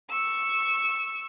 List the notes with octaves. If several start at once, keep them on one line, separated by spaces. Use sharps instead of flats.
C#6 E6